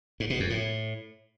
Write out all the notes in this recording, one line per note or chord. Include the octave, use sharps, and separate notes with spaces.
G#2
B2
F2
A2